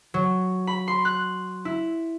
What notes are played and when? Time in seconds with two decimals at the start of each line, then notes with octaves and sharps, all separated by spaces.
0.14 F#3
0.67 B5
0.88 C6
1.05 F#6
1.65 E4